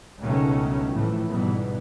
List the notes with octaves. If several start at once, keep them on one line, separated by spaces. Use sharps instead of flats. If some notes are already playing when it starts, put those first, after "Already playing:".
C#2 G2 B2 D#3 A3 C#4
G1 A2 E3 F3 A3
G1 G#2 B2 E3 G3 B3